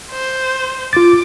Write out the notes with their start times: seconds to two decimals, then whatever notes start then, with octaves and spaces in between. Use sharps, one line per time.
0.11 C5
0.93 F4 D6 A6